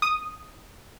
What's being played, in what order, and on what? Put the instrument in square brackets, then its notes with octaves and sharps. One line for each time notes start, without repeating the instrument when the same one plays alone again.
[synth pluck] D#6